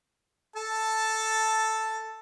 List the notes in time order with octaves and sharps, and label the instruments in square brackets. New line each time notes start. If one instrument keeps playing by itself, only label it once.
[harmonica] A4 A5